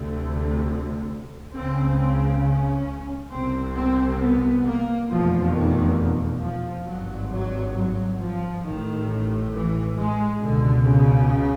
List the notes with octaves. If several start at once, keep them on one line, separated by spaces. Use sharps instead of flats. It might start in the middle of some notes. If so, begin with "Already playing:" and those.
Already playing: D2 C3 A3
C#2 C#3 C4
C4
C#4
C2 C3 C4
C4
B3
A#3
F1 E2 B2 F3
D#3
F3
G#1 G2 F#3
F#3
F#3
F3
A1 A2 D#3
E3
G#3
C#2 B2 D3
C#3